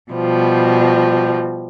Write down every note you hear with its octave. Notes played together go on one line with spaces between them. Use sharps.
B2 F3 G3